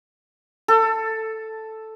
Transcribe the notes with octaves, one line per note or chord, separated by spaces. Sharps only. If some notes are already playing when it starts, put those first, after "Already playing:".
A4